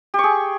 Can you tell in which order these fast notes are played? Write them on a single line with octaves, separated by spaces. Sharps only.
G4 C#6 G#4